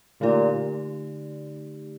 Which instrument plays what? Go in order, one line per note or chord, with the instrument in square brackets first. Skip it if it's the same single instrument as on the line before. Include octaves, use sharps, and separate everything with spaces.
[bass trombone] A#2 [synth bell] D3 A3 D#4 G4 D5